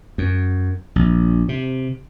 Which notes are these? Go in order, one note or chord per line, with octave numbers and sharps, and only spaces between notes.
F#2
A#1
C3